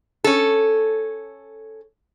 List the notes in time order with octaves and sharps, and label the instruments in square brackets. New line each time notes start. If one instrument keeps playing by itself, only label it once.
[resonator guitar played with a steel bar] C#4 A4